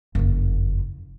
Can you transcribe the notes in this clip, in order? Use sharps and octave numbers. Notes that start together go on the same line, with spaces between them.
F#1 F2